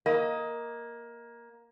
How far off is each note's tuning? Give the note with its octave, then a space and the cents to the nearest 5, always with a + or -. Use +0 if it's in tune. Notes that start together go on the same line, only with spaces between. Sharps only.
A#3 +10 D#5 +15